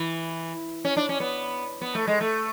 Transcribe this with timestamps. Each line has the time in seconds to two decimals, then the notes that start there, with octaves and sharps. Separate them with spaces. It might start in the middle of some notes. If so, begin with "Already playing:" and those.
Already playing: E3
0.85 C#4
0.97 D4
1.09 C#4
1.20 B3
1.82 B3
1.95 A3
2.07 G#3
2.21 A3